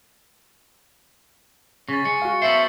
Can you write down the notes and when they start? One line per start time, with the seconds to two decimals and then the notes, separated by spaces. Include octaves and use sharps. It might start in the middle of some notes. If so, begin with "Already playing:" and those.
1.89 C#3 C#6 A6
2.05 G#3 C#7
2.22 F#4 F5
2.42 B3 A4 C5 E5 C#7 F#7 G7